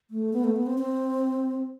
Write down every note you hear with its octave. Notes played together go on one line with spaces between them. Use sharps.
A3
B3
A3
B3
C4
C4